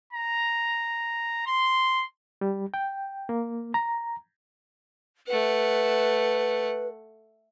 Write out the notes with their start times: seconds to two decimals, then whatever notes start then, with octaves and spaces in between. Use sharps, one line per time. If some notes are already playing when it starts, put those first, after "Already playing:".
0.13 A#5
1.47 C6
2.41 G3
2.74 G5
3.29 A#3
3.74 A#5
5.27 A3 B4 F#5